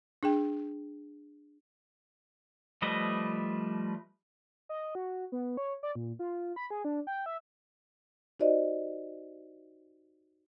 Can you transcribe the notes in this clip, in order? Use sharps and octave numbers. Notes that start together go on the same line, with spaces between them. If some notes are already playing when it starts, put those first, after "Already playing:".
D4 G#4 G5
F3 G3 A3 B4 D#5
D#5
F#4
B3
C#5
D5
A#2
F4
B5
G#4
D4
G5
E5
D#4 F#4 G4 C5 D5 D#5